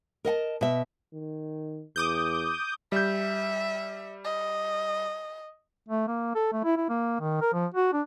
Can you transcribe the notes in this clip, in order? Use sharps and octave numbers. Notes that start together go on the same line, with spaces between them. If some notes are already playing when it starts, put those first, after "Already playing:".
A#4 D#5 F#5 A5
B2 E5
D#3
E2 D6 D#6 G6
G3 E5 G6
D#5
A3
A#3
A4
A3
E4
E4
A#3
D#3
A#4
F3
F#4
D4